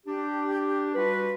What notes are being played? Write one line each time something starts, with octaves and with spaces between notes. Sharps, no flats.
D4 G4
G3 F4 F#4 B4